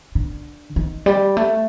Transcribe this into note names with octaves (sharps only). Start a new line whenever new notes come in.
D3
D#3
G3
A3